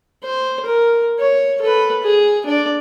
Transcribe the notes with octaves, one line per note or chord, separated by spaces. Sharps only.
C5
A#4
C#5
A4 B4
G#4
D4 D5